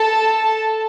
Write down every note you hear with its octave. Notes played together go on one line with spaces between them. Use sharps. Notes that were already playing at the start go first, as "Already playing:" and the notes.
Already playing: A4 A5